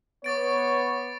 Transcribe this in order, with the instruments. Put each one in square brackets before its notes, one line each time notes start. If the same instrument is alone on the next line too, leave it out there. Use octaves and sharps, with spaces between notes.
[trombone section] B3 [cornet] C#5 [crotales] D6 A6 D7